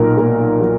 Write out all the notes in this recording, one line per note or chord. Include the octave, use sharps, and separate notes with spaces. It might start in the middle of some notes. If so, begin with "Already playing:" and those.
Already playing: B1 A#2 A#4
A#3
F#3